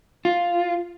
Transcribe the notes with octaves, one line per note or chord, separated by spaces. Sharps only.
F4